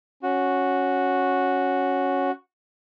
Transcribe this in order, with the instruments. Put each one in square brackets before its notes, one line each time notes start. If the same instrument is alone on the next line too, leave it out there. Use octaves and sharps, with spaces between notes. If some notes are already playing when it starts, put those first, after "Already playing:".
[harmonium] C#4 [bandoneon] F#4